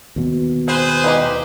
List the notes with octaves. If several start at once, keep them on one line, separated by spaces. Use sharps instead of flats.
D#2 B2
C4 G#4 B4 C5
E3 D#4 G4